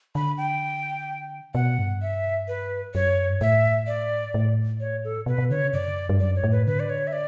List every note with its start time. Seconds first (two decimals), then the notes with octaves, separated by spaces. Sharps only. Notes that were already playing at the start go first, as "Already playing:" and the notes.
0.15 D3 B5
0.38 G5
1.54 B2 F#5
1.78 G2
2.02 E5
2.48 B4
2.94 F#2 C#5
3.30 G2
3.41 A2 E5
3.87 D5
4.34 A2
4.80 C#5
5.04 A4
5.26 B2 B4
5.38 B2
5.51 D3 C#5
5.62 C#3
5.73 F#2 D5
6.09 G2
6.19 F#2 D5
6.36 C#5
6.44 A2
6.52 B4
6.67 D3 B4
6.80 D5
6.89 C#5
7.07 E5
7.13 D5